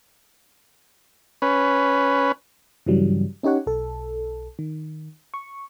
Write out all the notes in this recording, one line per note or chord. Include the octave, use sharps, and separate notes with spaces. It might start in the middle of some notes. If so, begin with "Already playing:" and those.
C#4 B4
G2 C#3 E3 F#3 G3
C#4 D#4 G4 C#5 F#5
B1 A4
D#3
C#6